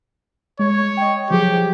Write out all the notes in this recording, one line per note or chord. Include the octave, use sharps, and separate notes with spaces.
G#3 C#5
D#5 G5
F3 F#3 G4 G#4